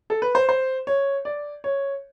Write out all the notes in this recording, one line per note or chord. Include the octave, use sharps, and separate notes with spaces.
A4
B4
C5
C5
C#5
D5
C#5